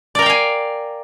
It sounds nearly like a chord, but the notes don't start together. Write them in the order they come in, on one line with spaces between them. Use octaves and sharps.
D5 A#4 G5 F5 G#5